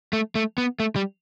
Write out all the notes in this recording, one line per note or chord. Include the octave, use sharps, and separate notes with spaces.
A3
A3
B3
A3
G3